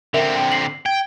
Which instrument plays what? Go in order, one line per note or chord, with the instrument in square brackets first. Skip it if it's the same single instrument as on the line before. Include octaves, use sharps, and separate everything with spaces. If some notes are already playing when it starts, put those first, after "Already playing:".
[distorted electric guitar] D3 C4 [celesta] A#4 E5 F7
[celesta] G5
C7 F#7
[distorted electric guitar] G5 [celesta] G#6